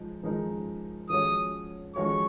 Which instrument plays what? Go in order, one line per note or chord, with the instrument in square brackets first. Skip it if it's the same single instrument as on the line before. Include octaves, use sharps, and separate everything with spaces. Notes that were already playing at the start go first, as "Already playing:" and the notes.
Already playing: [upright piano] F3 G#3 D#4
F3 G#3 D#4 A#4
[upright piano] F3 G#3 C#4 F#4 C#5 [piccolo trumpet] D#6
[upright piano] F3 G#3 C#4 F#4 C#5 [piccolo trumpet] C#6